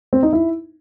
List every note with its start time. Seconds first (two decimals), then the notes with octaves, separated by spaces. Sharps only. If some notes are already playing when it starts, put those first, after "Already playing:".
0.13 C4
0.23 D#4
0.33 E4